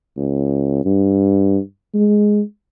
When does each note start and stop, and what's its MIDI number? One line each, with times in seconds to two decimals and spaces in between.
0.17 0.85 37
0.85 1.59 43
1.94 2.41 56